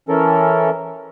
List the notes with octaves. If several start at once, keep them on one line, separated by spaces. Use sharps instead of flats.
E3 C#4 A4 A#4